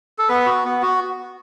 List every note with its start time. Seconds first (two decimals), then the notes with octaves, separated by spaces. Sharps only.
0.18 A4
0.29 B3 B4
0.46 F#4
0.65 B3
0.82 F#4